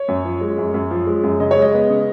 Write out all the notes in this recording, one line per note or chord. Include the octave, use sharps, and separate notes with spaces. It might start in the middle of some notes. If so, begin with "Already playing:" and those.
Already playing: C#5
F#2
F3
G#3
F#2
F#2
F3
G#3
F#2
C#3 D#5
C#5
G#3
D#5
B3
C#3